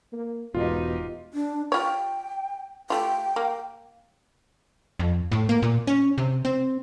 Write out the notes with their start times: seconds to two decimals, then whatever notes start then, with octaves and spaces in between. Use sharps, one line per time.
0.12 A#3
0.54 E1 G#2 B2 D#4 F4 G4
1.34 D4
1.72 F4 C#5 G5
2.90 A3 F4 G5
3.36 A#3
4.99 F2
5.32 A2
5.49 A#3
5.62 A#2
5.87 C#4
6.18 C3
6.45 C4